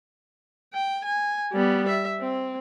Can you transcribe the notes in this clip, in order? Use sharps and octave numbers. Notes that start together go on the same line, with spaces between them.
G5
G#5
G3 B3
E5
C4